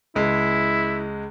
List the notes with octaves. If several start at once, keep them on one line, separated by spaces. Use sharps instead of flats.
C#2 G#3 E4